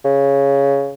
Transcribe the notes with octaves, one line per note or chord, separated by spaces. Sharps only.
C#3